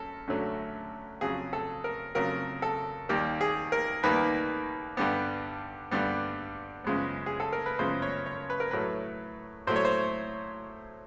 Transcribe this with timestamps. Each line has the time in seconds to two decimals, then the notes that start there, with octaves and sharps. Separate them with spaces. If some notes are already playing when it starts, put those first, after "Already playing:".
Already playing: F#2 A4
0.27 F#2 D3 F#3 A3
1.21 F2 C#3 F#3 G#4
1.53 A4
1.84 A#4
2.15 F2 C#3 F#3 A#4
2.62 A4
3.09 D#2 D#3 G3 A#3 G4
3.41 G#4
3.72 A#4
4.03 D#2 D#3 G3 A#3 B4
4.97 G2 D3 G3 B3
5.91 G2 D3 G3 B3
6.84 F#2 C#3 F3 G#3 B3
7.26 G#4
7.40 A4
7.53 A#4
7.66 B4
7.79 F#2 C#3 F3 G#3 B3 C5
8.02 C#5
8.26 C#5
8.50 B4
8.60 A#4
8.71 A2 F#3 A3 B4
9.67 A2 F#3 A3 C5
9.76 C#5
9.85 C5